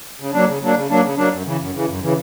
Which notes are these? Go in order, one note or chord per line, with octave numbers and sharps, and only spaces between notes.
C#3
F#3 A#3 D4
C#3
F#3 A#3 D4
C#3
F#3 A#3 D4
C#3
F#3 A#3 D4
F#2
C#3 E3
F#2
C#3 E3
F#2
C#3 E3